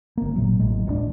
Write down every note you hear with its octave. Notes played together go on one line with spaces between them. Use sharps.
G1 A#3
A#2 F#3
A1 A2 G#3
D#1 G2 G#3 D4